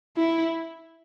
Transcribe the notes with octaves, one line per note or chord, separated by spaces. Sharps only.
E4